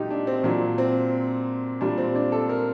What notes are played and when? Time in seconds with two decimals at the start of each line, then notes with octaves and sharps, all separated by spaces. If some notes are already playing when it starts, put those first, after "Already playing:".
Already playing: A#2 F#3 D#4 G4
0.11 D4
0.27 C4
0.44 A#2 F#3 D4
0.78 C4
1.81 A#2 G3 D4
1.98 C4
2.15 D4
2.32 A4
2.49 A#4